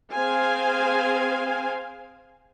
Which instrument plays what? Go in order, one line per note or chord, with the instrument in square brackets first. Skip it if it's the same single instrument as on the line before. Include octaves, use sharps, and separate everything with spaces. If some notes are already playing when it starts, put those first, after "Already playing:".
[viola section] C4 G#4 C5 F5 G#5